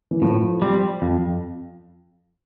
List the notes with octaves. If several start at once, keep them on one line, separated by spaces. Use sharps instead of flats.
E3
A2 F3
G3 C4
F2